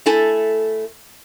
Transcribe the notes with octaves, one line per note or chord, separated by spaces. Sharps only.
A3 E4 A4 G#5